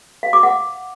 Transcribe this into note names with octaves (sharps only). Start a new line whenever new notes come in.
F5
D6
F#5